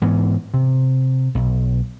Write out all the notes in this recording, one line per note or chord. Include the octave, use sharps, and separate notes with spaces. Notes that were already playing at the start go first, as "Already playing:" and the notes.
G#2 E3 B3
C3
B1